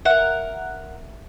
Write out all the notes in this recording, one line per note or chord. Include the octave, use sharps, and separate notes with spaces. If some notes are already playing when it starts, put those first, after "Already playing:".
A#4 E5 F#5